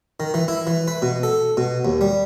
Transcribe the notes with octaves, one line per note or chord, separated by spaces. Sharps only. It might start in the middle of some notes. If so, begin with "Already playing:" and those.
D#3
E3
E4
E3
B4
B2
A4
B2
D#2
G3